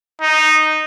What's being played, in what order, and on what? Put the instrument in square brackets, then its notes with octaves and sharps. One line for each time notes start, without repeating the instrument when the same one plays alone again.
[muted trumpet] D#4